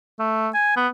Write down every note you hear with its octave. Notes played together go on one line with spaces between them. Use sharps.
A3
G#5
B3